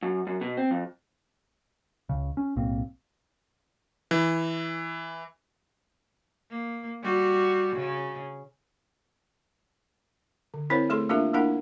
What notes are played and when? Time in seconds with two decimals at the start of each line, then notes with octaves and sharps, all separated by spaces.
0.02 F#2
0.27 F#2
0.41 B2
0.57 C4
0.71 F2
2.09 C#2 C#3
2.37 C#4
2.56 B1 A2 A#3 C4
4.11 E3
6.50 A#3
7.03 G3 F#4
7.76 C#3
10.54 D3
10.70 C4 E4 A#4 C5 C#5
10.90 A3 G#4 A4 C6
11.09 A#3 D4 F4 G4 A#4 E5
11.34 A#3 D4 E4 A#4 F#5